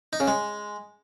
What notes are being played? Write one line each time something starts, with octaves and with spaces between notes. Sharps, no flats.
D#4
C#3
G#3